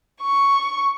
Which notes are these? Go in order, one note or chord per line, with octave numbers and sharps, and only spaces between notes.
C#6